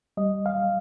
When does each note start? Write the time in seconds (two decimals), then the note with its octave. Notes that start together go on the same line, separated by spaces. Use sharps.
0.17 G3 D#5
0.46 F5